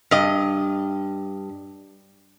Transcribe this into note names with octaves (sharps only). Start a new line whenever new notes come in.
G2 D#5